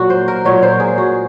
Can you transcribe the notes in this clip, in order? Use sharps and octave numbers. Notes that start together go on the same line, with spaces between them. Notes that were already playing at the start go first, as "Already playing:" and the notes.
Already playing: A#2 F#3 F#4
C5
A#4
A#2 F#3 C#5
C5
G#4
F#4